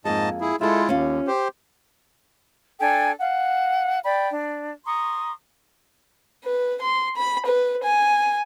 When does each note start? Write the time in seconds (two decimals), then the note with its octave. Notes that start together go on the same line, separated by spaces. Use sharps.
0.05 F2 G#2 G#3 A#3 D#5 A5
0.41 E4 G#4
0.61 G#3 E4 F4 A4 E5
0.89 D#2 C#4 F4
1.27 G4 C5
2.80 D4 A4 G5 G#5
3.19 F5 F#5
4.03 D5 G5 B5
4.30 D4
4.86 A#5 C6 C#6 D#6
6.44 B4
6.81 C6
7.16 B5
7.46 B4
7.83 G#5